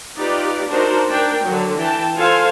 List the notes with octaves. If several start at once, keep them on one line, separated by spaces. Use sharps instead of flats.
D#4 F4 G4 B4 D5
D4 D#4 F#4 A#4 C5
D4 A#4 G5
D3 F#3
E3 G5 A5
F4 A4 C5 F5 G#5